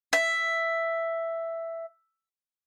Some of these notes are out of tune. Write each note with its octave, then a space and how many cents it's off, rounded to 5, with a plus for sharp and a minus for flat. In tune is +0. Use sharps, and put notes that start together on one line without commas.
E5 +5